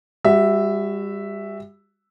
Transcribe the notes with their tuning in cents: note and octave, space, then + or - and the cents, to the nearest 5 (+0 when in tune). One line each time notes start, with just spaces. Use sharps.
G3 +35 F#4 +0 E5 +0